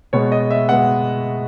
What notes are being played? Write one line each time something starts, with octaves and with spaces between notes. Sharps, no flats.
B2 G#3 B3 C#5
D#5
E5
B2 G#3 B3 F#5